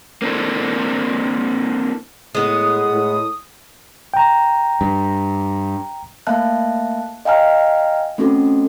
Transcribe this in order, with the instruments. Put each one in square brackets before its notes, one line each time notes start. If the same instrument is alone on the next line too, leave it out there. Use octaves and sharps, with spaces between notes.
[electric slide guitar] A#3 C4 D4 E4 A4
[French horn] A2 [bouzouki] G#3 B3 [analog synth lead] D#6
[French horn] A2
[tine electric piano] G5 A#5
[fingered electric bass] G2
[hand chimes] A3 A#3 E5 F5 A5 F#6
D#5 F5 G5 G#5 A#5 F6
A3 C4 C#4 F#4 A4